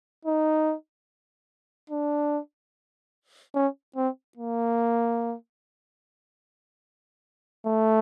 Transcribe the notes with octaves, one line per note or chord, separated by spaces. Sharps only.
D#4
D4
C#4
C4
A#3
A3